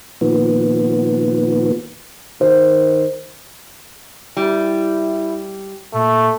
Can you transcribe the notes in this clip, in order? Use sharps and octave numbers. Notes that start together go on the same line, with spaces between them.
A#2 D#3 F3 B3
D#3 C5
G3 E4
A#2 A3